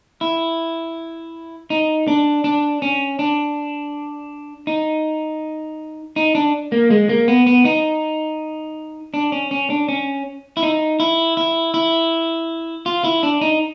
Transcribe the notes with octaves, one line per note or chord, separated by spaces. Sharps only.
E4
D#4
D4
D4
C#4
D4
D#4
D#4
D4
A#3
G#3
A#3
B3
B3
D#4
D4
C#4
C#4
D4
C#4
E4
D#4
E4
E4
E4
F4
E4
D4
D#4